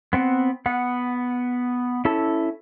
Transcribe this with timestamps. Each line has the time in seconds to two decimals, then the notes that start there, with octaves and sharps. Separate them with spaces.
0.13 B3 C4 F#5
0.66 B3 F#5
2.05 C#4 E4 A4